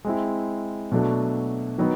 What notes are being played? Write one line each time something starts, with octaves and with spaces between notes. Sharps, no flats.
G#3 C4 E4
B2 F#3 A3 D4
D#3 F#3 B3 D#4